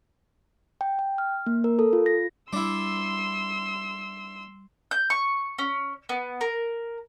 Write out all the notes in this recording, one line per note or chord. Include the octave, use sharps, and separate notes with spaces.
G5
G5
F6
A#3
A#4
A4
F4
A#6
G3 D4 E4 C6 E6
G6
C#6
C#4
B3
A#4